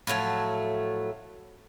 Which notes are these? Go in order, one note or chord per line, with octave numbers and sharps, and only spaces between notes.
A2 F3 F#3 A3